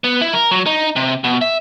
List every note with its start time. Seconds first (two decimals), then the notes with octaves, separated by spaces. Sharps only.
0.04 B3
0.21 E4
0.33 A#4
0.51 F#3
0.66 D#4
0.96 C3
1.24 B2
1.42 E5